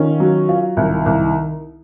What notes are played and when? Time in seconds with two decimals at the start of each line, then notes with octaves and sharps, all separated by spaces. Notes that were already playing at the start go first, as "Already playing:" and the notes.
Already playing: D#3 C#4 F4
0.20 F#3
0.49 F4
0.77 C2 D#3
1.06 C2